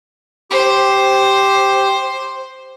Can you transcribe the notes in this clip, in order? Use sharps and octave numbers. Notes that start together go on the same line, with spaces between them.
G4 C5